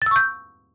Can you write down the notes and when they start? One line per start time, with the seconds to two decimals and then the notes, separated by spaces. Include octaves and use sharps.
0.02 A6
0.06 E6
0.11 C#6
0.16 G6